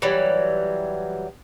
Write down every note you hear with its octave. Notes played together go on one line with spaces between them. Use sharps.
E3 F#3 G3